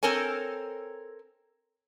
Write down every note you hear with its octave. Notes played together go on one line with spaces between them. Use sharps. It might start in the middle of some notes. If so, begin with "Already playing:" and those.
C4 A4 A#4 C#5 G#5